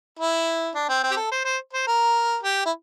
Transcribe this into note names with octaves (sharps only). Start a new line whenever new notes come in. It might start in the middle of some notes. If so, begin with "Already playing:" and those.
E4
D4
C4
C4
G4
A4
C5
C5
C5
A#4
G4
E4